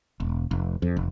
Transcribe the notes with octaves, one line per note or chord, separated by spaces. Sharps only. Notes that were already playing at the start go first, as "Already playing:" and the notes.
E1
F1
F2
F1